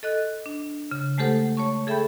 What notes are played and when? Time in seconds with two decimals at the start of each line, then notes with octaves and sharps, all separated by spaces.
0.03 A4 D#5 F#6
0.46 D4
0.91 C#3
1.18 G#3 A3 G4 A4 C5 F#5
1.57 C#5 A5 C#6
1.87 G#4 A4 E5 G5 B5 G6